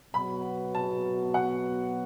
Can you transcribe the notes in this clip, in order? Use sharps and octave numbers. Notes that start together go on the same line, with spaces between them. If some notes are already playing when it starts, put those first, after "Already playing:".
B2 F#3 B3 F#4 B5
A5
F#5